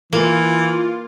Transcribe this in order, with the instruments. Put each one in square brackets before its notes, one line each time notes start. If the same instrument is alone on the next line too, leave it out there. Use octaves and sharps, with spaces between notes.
[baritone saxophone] E3 [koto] A#3 [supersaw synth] F4